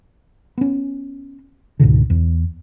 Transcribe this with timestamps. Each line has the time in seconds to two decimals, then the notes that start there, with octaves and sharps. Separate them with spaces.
0.58 B3 C#4
1.80 C#2 G#2 B2 D3
2.10 E2